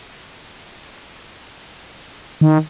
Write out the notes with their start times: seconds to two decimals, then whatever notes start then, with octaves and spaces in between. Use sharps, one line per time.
2.41 D#3